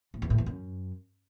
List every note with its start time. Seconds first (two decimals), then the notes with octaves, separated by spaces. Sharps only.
0.14 A2
0.22 E2
0.30 A2
0.38 E2
0.46 F#2